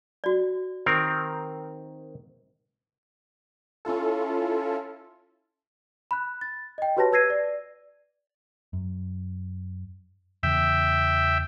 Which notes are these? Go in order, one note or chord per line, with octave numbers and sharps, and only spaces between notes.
F#4 D5
D#3 C4 A#4
C#4 E4 F4 A4
B5 F#6
A6
D#5 G5
F#4 G4 B4 C#5 A5 A#6
B4 E6 G#6 A#6 C7 D#7
D5
F#2
E2 C#3 E3 E5 G5